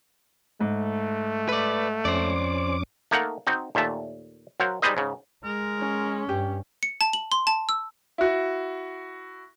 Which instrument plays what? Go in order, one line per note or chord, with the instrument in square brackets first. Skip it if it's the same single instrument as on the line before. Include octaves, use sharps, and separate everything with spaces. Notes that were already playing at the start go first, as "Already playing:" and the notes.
[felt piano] G#2 [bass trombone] A3
[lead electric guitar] B4 D5
[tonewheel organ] F2 C#4 D6 [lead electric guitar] C5 D5
[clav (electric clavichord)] A3 A#3 D#4 A#4 F5 F#5
C4 D#4 F#4
D#2 A#2 A3 E5 A5
F#3 F#4 A#4 C5 F5
G3 D#4 G#4 B4 C5 D#5
G#2 C#3
[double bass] G#3 [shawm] A#4
[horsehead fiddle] C#4
[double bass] G2 [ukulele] G4
[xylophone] C#7
A5
F#7
C6
A5
E6
[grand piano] E4 F#4